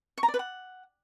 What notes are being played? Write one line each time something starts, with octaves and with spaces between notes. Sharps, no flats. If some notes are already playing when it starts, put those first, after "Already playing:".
C#6
A#5
D5
B4
F#5